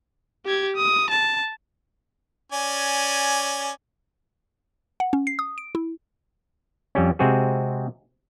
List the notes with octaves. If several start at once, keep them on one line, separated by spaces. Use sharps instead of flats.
G4 G#6
D#6
A5
C#4 D5 G#5
F#5
C#4
C7
D#6
D7
E4
F2 G3 C#4
C3 G#3 C4 F#4 G#4